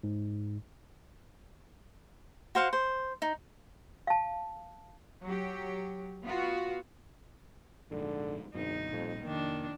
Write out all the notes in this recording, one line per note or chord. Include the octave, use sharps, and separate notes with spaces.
G#2
F#4 C5 F5 F#5
C5
D#4
F5 A5
F#3 G4
B3 F4 F#4
A#1 G#2 D3
G#1 F#2 B2 D3 D#4
A#1 F2 A#2 G3
F1 D#3 A#3 D4